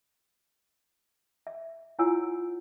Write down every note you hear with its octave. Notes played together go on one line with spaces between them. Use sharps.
E5
E4 F4 C#5 F#5 G#5 E6